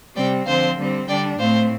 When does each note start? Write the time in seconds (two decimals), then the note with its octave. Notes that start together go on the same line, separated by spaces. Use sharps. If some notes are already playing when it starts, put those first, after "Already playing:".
0.16 C3 G3 C4 D5 G5
0.46 D3 F3 C4 C5 F5
0.78 D3 G3 C4
1.08 D3 G3 D4 D5 G5
1.39 A2 A3 C4 C5 F5